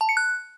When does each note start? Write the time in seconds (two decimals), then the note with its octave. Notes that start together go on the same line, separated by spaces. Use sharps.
0.01 A5
0.09 C#7
0.17 F#6